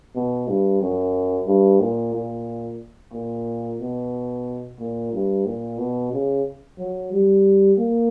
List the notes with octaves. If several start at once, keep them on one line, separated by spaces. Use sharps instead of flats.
B2
G2
F#2
G2
A#2
A#2
A#2
B2
A#2
G2
A#2
B2
C#3
F#3
G3
A#3